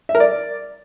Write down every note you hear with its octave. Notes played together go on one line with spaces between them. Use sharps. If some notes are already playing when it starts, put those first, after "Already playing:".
E5
A#4
D5